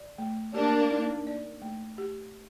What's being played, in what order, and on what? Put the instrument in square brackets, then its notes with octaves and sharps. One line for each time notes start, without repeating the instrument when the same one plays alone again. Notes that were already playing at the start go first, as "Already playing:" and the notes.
Already playing: [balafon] D5
A3
[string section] A#3 D4 [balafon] G4
[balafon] D#4
D5
A3
G4